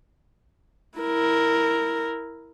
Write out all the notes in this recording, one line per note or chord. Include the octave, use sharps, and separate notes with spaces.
E4 A#4